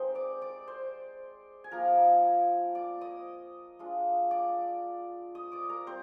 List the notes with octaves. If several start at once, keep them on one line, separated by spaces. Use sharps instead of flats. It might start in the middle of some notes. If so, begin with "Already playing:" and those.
Already playing: G#3 C4 D#4 G4 C5 G5 C6
D5 D6
D5 D6
C5 C6
G#5
F3 A#3 D#4 A#4 A#5
D5 D6
D#5 D#6
G#3 D4 F4
D5 D6
D#5 D#6
D5 D6
A#4 A#5
G3 C4 C5